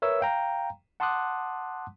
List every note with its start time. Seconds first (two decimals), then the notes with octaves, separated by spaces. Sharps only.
0.02 A#4 B4 C#5 E5 E6
0.21 F5 G5 A#5
1.00 F#5 A5 C6 D6 D#6 F#6